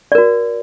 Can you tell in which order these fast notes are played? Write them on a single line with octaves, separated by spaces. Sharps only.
D5 A#4 F#4